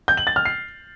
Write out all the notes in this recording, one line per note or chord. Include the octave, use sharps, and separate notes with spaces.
G6
F#7
A6
F6
C7